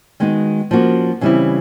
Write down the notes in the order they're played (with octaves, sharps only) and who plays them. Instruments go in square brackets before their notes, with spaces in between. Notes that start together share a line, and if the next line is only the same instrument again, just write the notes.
[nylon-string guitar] D#3 G#3 B3 D#4 F#4
F3 A#3 C#4 F#4
C#3 E3 G3 C4 E4